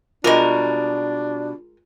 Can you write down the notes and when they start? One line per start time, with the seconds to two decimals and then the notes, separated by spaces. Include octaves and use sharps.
0.24 B2 G3 G#3 D4 F4 A#4